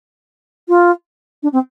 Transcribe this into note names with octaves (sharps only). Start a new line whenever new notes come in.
F4
D4
C4